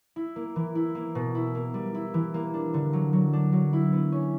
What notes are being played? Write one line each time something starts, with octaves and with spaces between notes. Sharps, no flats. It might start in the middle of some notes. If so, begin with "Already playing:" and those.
E4
A#3
E3
E4
A#3
B2
E4
A#3
G3
E4
E3
A#3
D4
D3
F#3
F#3
D4
F#3
E4
B3
C#4